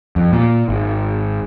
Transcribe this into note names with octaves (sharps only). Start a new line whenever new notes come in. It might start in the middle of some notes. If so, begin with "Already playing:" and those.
F2
A#2
G#1